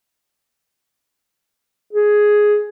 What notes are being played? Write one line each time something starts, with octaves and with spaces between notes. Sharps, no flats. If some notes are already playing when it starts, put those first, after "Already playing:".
G#4